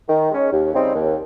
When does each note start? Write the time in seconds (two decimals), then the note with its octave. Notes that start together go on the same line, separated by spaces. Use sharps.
0.08 D#3
0.31 G#3 C#4
0.52 D#2
0.73 C#3 G3 C4 D#4
0.95 D#2